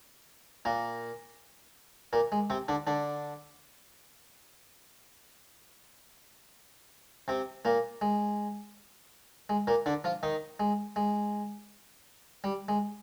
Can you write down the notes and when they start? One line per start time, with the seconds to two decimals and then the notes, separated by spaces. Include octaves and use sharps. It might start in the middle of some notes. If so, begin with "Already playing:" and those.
0.65 A#2 A#3
2.13 A#2 A#3
2.32 G#3
2.50 C3 C4
2.68 D3 D4
2.87 D3 D4
7.28 C3 C4
7.65 A#2 A#3
8.01 G#3
9.49 G#3
9.67 A#2 A#3
9.86 D3 D4
10.04 F3 F4
10.23 D#3 D#4
10.60 G#3
10.96 G#3
12.44 G3
12.69 G#3